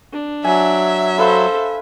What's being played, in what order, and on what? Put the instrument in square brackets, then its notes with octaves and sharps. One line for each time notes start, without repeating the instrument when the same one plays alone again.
[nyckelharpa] D4
[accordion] F#3 [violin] E5 [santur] G#5
[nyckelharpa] A4 C5 [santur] B4 F5 C6